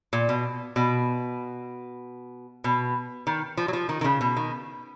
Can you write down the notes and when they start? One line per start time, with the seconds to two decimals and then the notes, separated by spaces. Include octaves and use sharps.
0.13 A#2
0.29 B2
0.76 B2
2.64 B2
3.27 D#3
3.57 F3
3.68 F#3
3.73 F3
3.89 D#3
4.01 D#3
4.04 C#3
4.21 B2
4.37 D#3